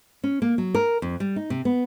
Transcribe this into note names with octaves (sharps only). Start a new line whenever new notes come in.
C#4
A#3
F#3
A#4
F2
G3
D#4
C3
B3